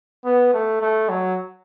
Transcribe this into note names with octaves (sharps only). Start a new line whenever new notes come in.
B3
A3
A3
F#3